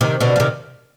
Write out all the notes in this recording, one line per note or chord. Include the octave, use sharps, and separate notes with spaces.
C3 D#3
B2 D3
F3
C3 D#3